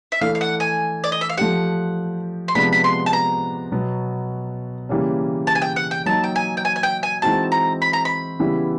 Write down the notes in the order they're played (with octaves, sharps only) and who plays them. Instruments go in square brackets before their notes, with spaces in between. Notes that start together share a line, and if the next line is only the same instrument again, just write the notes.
[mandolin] E5
[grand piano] E3 A3 D4 [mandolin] F5
[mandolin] F5
F#5
G#5
D5
D#5
E5
F5
[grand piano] F3 A3 D4 G4 [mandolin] F#5
[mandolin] C6
[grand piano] C3 F3 G#3 B3 D4 [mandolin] B5
[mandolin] B5
C6
A5
A#5
[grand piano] B2 F#3 B3
C#3 E3 G3 A#3 C#4
[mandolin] A5
G#5
G5
F#5
G5
[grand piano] F#3 A#3 D#4 [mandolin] A5
[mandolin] G5
G#5
G5
G#5
G#5
G5
G#5
[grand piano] E3 G#3 C4 D#4 F#4 [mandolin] A5
[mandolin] A#5
B5
A#5
B5
[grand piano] C#3 E3 G3 B3 E4